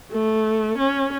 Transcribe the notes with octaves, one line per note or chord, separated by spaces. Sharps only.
A3
C#4